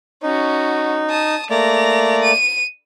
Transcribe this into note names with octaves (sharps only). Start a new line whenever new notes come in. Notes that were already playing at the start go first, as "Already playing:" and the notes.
C#4 D#4 F#4
A5 D#6
A3 A#3 D5 A#6 F7
D#7